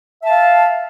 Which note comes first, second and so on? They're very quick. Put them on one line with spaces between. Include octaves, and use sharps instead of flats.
E5 A5 F5